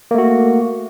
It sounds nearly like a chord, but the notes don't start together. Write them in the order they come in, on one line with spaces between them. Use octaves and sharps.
A#3 A3 F#4